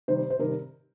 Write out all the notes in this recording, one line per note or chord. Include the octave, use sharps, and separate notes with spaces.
C3 D#3 G3 C5
C5
C3 D#3 G3 A#4